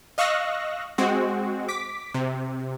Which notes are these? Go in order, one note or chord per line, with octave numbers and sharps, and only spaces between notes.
D#5 F5 C#6 E6 F#6 A#6
G#3 C4 F#4
D6 B6
C3